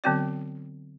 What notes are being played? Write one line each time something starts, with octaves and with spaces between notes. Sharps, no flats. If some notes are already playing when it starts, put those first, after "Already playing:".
D3 F#3 B3 C4 F#4 D5